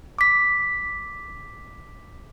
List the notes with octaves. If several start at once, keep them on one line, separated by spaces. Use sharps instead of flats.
D6 B6